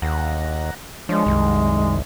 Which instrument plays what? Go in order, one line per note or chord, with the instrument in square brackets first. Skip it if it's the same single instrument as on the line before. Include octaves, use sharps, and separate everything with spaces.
[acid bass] D#2 [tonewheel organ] F#5 A#5
[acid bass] F3 [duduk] G#3 [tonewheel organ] D4 C#5
[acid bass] C2 [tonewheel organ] F#2 D#3